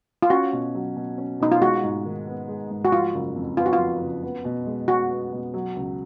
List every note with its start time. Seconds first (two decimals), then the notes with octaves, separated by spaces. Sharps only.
0.23 F4
0.30 C#4 F#4
0.53 B2
0.74 F#3
0.96 B2
1.18 C#4
1.40 B2 D#4
1.52 F4
1.62 G#3 F#4
1.84 G#2
2.06 D#3
2.27 B3
2.48 G#3
2.70 G#2
2.85 F#4
2.92 F3 F4
3.14 F#1
3.36 F2
3.57 B3 F4
3.66 F#4
3.73 F4
3.79 F3
4.01 F#1
4.23 B3
4.45 B2
4.66 G#3
4.88 B2 F#4
5.11 B3
5.32 B2
5.54 F#3
5.76 C#2